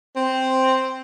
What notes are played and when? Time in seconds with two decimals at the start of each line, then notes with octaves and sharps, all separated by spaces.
0.16 C4